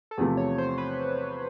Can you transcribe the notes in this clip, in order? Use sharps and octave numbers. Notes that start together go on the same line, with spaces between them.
A4
E2 C3 F3 A3 G#4
C#5
C5
B4